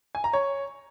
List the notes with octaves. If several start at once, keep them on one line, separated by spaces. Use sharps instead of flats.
G#5
A#5
C#5